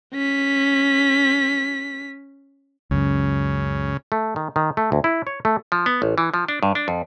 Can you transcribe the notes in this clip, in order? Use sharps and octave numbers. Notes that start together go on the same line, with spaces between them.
C#4 B6
C#2 F#2 C#3
A3
D#3
D#3
A3
D2
E4
C#5
A3
F3
B3
A1
E3
F3
D4
G2
D4
F2